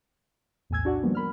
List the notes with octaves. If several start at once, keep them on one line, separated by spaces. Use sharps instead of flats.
B1 E2 A2 G#5 E6 G#6
D4 F#4 D5 F#5
D#3 F3 G3 A#3 B3
A#4 B5 F6